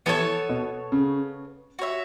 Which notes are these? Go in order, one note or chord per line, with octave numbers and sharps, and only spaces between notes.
E3 B3 A4 C#5 A5
B2
C#3
F#4 C#5 E5